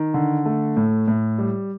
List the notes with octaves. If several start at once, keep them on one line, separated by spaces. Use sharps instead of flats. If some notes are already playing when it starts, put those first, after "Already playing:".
Already playing: D#3
D3
A3
A2
A2
G3